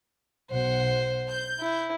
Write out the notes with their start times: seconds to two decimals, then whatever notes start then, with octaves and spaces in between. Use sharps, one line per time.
0.50 B1 C5 F#5
1.31 G6
1.60 E4